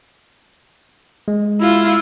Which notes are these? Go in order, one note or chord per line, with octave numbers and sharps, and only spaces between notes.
G#3
E4 F4